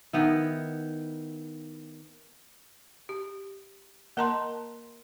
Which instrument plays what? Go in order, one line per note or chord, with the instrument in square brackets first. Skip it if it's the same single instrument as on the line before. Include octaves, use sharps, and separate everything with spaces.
[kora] D#3 B3 E4
[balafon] G4
A#3 A#4 D#5 A5 A#5 C6